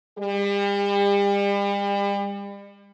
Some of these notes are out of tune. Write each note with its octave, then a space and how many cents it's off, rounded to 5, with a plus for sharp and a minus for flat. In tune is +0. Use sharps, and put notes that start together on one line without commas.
G3 +40